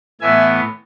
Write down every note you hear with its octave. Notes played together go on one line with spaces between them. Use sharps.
A2 E3 B3 E5 G#5